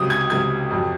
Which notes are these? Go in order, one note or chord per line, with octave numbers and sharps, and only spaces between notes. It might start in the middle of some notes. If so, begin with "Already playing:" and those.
Already playing: C#2 C3 F#3 D#6
G#6
C#2 C3 F#3 G#6
F2 C3 F#3